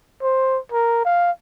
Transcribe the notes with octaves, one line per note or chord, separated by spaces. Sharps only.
C5
A#4
F5